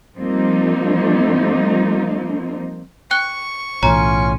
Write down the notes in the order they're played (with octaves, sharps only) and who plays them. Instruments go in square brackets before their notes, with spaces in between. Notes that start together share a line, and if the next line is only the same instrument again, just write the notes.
[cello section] F3 G3 A#3 C4 D#4 F4
[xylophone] G5 F#6 G7 [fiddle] C#6
[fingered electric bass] B1 A2 E3 [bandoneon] C#4 F4 G#5 [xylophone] C#5 A#5